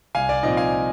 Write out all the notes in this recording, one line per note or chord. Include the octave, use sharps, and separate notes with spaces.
C2 F5 G#5
D5
A#2 F3 C4 D#4 D#5
F5 G#5